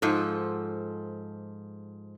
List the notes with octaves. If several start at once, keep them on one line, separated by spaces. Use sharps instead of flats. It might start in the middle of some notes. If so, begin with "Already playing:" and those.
G#2 F3 A4